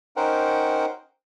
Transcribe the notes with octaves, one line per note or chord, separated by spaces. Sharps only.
C#4 D#4 A#4 C5 F#5 G5